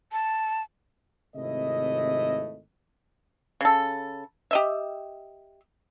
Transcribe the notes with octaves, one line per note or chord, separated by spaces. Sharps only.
A5
G#1 C3 A3 E4 D#5
C#3 A4
G4 D#5 E5